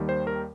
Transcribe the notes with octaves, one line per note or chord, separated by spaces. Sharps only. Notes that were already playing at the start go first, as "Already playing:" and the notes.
Already playing: D#2 D#3 G3
C5
A#4